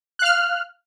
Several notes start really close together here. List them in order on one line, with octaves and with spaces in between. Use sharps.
F#6 F5 F6